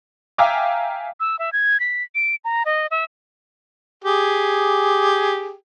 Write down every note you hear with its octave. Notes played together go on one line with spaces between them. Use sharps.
E5 F5 G5 G#5 A#5 D6
E6
E5
G#6
B6
D7
A#5
D#5
E5
G4 G#4